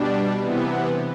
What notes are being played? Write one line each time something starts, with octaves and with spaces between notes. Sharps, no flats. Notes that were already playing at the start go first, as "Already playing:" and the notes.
Already playing: B2 G3 D4
C3 E3 B3